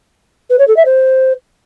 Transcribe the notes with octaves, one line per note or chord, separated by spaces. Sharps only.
B4
C#5
A4
E5
C5